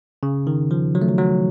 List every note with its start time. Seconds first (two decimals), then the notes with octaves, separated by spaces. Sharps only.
0.23 C#3
0.47 D#3
0.71 F3
0.95 F#3
1.02 A3
1.08 F#3
1.18 F#3